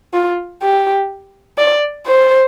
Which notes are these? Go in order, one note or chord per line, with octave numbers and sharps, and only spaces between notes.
F4
G4
D5
C5